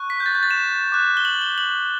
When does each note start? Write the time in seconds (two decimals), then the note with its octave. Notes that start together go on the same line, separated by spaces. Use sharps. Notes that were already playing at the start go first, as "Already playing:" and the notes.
Already playing: C#6 F#6
0.10 B6
0.20 G6
0.26 A6
0.35 G6
0.43 A6
0.51 E7
0.92 D6 F#6
1.17 G7
1.25 F#7
1.41 G7
1.58 F#7